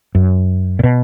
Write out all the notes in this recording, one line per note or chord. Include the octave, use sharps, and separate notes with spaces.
F#2
A#2
B2